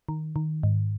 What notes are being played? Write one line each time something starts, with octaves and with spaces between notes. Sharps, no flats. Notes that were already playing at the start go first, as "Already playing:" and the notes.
D#3
D#3
G#2